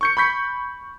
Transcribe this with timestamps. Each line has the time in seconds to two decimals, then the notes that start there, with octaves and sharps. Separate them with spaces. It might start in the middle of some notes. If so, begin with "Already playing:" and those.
0.01 C#6 G6 C#7
0.17 B5 C#6 G6 B6